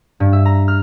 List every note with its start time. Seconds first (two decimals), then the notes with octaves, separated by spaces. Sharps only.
0.20 G2
0.33 E5
0.46 A#5
0.68 F6